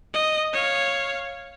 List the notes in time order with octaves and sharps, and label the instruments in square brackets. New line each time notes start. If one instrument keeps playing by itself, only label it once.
[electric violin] D#5
C#5 F5